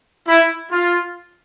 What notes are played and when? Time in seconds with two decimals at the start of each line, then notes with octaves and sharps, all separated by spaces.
0.27 E4
0.70 F4